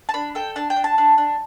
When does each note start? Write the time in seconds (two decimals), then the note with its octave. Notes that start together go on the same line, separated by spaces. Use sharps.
0.09 A5
0.14 D4 B5
0.35 A4 G5
0.56 D4 A5
0.70 G5
0.76 D4
0.84 A5
0.98 D4
1.18 D4